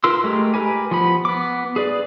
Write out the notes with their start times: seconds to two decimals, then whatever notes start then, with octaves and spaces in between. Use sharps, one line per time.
0.04 F4 A#4 B4 C6 E6
0.24 G#3 A3 G4 A#4
0.54 G4 A#4 B4 G#5
0.91 F3 B3 B5
1.25 B3 D6
1.76 G#4 B4 D5